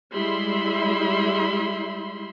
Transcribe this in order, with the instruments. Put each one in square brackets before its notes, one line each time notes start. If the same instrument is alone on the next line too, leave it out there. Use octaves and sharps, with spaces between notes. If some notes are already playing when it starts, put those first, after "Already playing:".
[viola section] G3 G#3 E4 E5 B5 C6